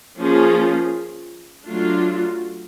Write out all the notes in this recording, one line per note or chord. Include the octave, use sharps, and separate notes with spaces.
F3 A#3 C#4 F4 G#4
F#3 A3 D4 F4